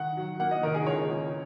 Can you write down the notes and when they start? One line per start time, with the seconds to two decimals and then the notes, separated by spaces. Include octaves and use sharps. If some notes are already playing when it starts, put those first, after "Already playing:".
Already playing: D#3 F#5
0.17 F#3
0.39 A#3 F#5
0.51 D#5
0.63 D#3 A#4
0.74 G#4
0.86 C#2 C#5
1.09 C#2